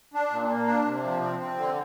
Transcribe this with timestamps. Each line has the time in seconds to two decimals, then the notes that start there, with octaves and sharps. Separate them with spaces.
0.14 D4
0.31 A#2
0.49 A#3
0.67 D4
0.86 C3
1.03 F3
1.22 C4
1.39 C4
1.57 D3